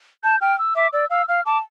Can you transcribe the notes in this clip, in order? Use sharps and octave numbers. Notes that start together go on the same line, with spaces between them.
A5 G6
G5 F6
E6
E5 D6
D5 E6
F5 E6
F5 F6
A5 D6